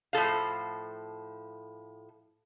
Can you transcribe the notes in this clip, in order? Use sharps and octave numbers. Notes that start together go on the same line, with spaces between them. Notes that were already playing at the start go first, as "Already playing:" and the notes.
A2 F3 A4 F5